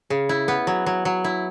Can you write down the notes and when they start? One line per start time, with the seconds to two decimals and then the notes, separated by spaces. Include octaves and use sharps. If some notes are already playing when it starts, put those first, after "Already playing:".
0.10 C#3
0.29 E4
0.48 B3
0.67 F#3
0.86 F#3
1.05 F#3
1.24 E4